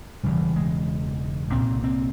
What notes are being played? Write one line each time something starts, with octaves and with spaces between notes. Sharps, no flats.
E1 E2 C#3 G3
G#3
C2 A#2 C4
C4